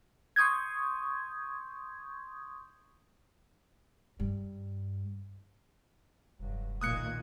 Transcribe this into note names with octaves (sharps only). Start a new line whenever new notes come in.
C6 C#6 D#6 G6 G#6
G2
F1 G2 F#3
B1 A#2 D#3 D#6 F#6 G#6 C#7